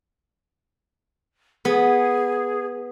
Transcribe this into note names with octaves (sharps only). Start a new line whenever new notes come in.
B3 G#4